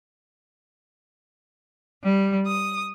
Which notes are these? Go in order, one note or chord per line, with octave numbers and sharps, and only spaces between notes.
G3
D#6